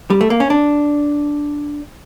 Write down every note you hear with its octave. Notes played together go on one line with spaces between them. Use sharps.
G3
A3
A#3
C#4
D4